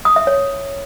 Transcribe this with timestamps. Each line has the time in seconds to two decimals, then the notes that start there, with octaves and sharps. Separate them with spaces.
0.05 D#6
0.16 E5
0.27 C#5